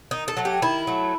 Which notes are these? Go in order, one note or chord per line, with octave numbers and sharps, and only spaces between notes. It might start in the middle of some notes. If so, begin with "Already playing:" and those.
D#3 D#4
A4
F#3 A3
G4
D#3 E4
F#3 A3